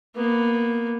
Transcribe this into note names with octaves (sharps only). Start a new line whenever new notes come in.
A#3 B3